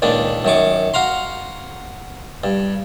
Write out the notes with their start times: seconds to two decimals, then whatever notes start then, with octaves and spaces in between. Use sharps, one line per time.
0.02 C#2 A#2 D#3 D4
0.45 F#2 D#3 C#6 D6
0.94 F#4 F5 A#5 C6
2.44 G2